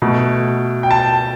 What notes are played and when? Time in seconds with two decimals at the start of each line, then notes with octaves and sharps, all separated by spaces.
0.02 B2 A3
0.83 G5
0.91 A5